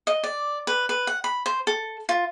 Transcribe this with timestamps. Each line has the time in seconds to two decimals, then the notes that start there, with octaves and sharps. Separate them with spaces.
0.07 D#5
0.24 D5
0.67 B4
0.89 B4
1.07 F#5
1.24 B5
1.46 C5
1.67 A4
2.09 F4